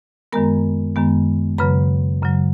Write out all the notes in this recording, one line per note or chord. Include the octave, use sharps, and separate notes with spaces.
F#2 D#3 G#3 B3 A#4 A#5
F#2 D#3 G#3 B3
F#2 C#3 F#3 B4 B5
F#2 C#3 F#3